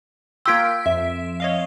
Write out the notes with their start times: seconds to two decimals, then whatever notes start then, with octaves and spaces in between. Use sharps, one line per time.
0.46 A#3 F4 G5 C6 E6 G#6 B6 D7
0.86 F2 E5
1.40 C#5 D#5 F5